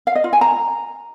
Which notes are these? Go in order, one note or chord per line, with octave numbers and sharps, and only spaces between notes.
F5
D#5
F4
G#5
A#5